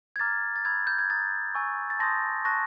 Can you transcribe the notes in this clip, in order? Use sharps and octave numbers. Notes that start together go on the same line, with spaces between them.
G#6
A#5 D6 F6 A6
A6
B5 E6 G6 G#6
G6
G#6
A#5 D#6 G6 A6
G#5 C#6 E6 G6
A6
A5 C6 D#6 G6 A#6
A5 C#6 F#6 A#6